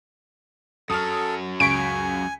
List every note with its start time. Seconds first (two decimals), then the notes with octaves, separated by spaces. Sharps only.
0.90 F#2 F#3 A4 D#6 F6
1.60 C#2 G#5 C#6 B6 D7